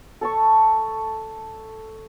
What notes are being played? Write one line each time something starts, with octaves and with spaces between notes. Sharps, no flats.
A4 A5 C#6